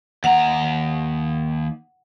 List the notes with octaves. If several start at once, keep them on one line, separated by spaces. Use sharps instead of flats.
D#2 F#5 A#5